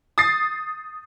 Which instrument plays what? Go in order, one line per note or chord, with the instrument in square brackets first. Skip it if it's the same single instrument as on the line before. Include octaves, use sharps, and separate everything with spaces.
[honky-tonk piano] D#6 A6 C7